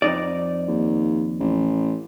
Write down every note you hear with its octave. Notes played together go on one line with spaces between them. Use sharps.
F2 D#4 D5
D#2
A1